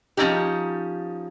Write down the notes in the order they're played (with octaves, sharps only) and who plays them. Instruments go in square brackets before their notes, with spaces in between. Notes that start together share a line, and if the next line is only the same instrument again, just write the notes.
[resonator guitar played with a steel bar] F3 A#3 C#4 D#4 G4